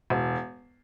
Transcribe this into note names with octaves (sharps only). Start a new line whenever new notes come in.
E1